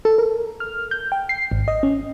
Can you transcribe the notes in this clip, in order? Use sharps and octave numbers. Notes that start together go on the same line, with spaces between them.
A4
A#4
F6
G6
G5
C7
G#1
D#5
C#4